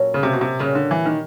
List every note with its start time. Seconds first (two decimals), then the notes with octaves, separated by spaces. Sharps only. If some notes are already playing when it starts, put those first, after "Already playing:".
Already playing: A#2 F#3 A3 C#4
0.14 C#3
0.23 C3
0.33 B2
0.41 C3
0.59 A#2 C#3 G3 A#3 C#4 F#4
0.75 D3
0.91 E3
1.06 D#3